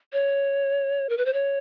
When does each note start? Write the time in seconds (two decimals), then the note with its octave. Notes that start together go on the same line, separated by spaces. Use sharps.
0.13 C#5
1.09 A#4
1.18 B4
1.25 C5
1.33 C#5